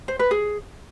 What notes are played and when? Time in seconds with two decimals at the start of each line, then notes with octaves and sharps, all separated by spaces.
0.08 C5
0.19 B4
0.31 G#4